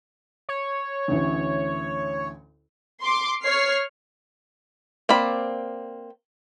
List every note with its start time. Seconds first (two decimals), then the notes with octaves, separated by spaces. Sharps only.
0.49 C#5
1.08 A1 D2 E3
3.02 C6 D6
3.42 C#5 F6 C7
5.09 A#3 C4 D5 B5